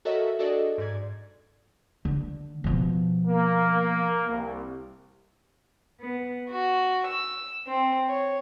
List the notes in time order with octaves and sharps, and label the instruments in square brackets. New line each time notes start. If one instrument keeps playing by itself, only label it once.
[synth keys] F#4 A4 A#4 C#5 D#5 E5
D4 F#4 G#4 A4 D5 D#5
G#2 D5 G#6
[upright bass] D3
B2 F3
[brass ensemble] A#3
C2
[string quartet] B3
F#4
E6
C4
C#5